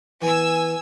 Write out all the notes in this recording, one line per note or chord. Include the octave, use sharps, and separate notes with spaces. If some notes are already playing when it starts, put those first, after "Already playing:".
E3 B3 G#5 E6